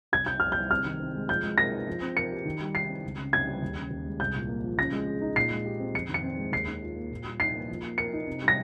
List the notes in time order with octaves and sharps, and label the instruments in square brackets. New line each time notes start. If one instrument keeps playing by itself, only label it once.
[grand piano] C2 [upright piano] G#6
[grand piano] C3 [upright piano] G6
[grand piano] C2 [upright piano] F6
[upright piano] G6
[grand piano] G3
[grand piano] C3 [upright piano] F6
[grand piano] D#3
C4
G#3
[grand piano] F3 [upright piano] G6
[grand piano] G#3
[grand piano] A#4 [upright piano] A#6
[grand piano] D#4
F3
C4
[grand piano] A#4 [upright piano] C#7
[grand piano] G4
D#3
G3
[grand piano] D#4 [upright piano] C7
[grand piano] C4
C#2
C#3
[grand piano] C#2 [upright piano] G#6
[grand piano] G3
D#2
C#3
D#2
G#3
[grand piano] C2 [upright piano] G6
[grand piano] A#2
A#3
F3
[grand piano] C#3 [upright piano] A#6
[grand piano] G#3
G#4
D#4
[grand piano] A#2 [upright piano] C7
[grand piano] G#3
G4
C4
[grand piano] F2 [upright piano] C#7
[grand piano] D#3
[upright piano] C#7
[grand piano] C4
G#3
[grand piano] D#2 [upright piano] C7
[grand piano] D#3
F4
A#3
A#2
G3
[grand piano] D#4 [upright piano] C7
[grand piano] A#3
F3
A#3
[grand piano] A#4 [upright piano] C#7
[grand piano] D#4
C3
G3
[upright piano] A#6